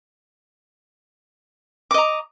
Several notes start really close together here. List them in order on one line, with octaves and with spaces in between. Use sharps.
D6 D#5 A#5